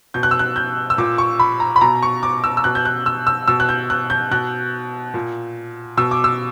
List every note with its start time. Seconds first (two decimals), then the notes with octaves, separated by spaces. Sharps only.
0.14 B2 G6
0.23 F#6
0.31 E6
0.39 F#6
0.56 G6
0.90 E6
0.98 A#2 D6
1.18 C#6
1.39 B5
1.60 A#5
1.76 B5
1.81 B2 A#5
2.03 C#6
2.23 D6
2.44 E6
2.57 E6
2.64 B2 F#6
2.75 G6
2.85 F#6
3.06 E6
3.27 E6
3.48 B2 E6
3.60 F#6
3.69 G6
3.90 F#6
4.10 G6
4.31 B2 F#6
5.14 A#2
5.97 B2 E6
6.11 D6
6.24 E6